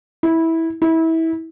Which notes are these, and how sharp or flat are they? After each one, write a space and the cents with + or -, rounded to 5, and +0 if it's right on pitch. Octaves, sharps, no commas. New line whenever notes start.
E4 -15
E4 -25